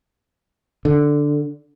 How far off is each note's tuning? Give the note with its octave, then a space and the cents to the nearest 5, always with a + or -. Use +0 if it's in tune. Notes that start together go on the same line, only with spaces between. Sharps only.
D3 +0